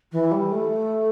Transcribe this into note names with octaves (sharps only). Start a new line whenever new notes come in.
E3
G3
A3